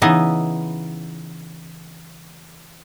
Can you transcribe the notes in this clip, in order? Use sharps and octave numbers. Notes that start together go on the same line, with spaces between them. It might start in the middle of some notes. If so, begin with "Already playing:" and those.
C#3 E3 B3 D#4 E4 D#5